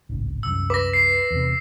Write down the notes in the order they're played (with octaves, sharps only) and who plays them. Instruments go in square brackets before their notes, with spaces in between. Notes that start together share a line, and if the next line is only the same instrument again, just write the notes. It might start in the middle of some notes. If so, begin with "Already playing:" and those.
[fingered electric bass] D1 G#1 C#2
[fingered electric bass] C2 F#2 [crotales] E6
[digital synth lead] B4 [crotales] D6 A#6
[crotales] C7
[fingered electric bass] E2 C3